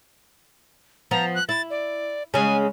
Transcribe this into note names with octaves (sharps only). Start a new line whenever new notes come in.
F3 B3 A#5
F#6
E4 A6
D5
C#3 G#3 G#5